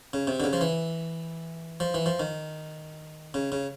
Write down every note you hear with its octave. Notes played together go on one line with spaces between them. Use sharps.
C#3
C3
D3
C#3
F3
E3
F3
E3
F3
D#3
C#3
C#3